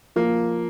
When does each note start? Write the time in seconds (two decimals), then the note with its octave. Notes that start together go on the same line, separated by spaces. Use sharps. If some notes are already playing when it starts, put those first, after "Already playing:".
0.16 F3 A#3